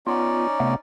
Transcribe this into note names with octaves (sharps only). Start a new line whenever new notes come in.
B3 C#4 D#4 F4 D5
C3 A3 B3